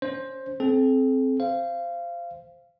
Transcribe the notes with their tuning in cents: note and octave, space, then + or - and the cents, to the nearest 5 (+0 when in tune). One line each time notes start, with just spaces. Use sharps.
C#4 +35 C5 +10
C4 +0 A4 -40
C5 +0 F5 -20